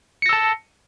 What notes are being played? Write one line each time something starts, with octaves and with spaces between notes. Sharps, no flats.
A5 E6 A#6 C#7